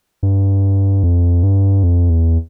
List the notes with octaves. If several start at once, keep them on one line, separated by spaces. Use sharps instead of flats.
G2
F2
G2
F2
E2